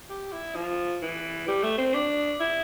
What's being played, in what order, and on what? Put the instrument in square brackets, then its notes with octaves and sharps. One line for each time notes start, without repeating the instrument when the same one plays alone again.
[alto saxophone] G4
E4
F3
E3
G3
A3
C4
D4
E4